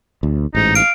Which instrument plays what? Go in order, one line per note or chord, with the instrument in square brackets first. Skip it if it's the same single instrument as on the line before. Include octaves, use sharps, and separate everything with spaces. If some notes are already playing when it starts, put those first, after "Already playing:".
[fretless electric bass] D2
[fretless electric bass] A1 G#2 [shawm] D#4
[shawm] F5 [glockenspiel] D7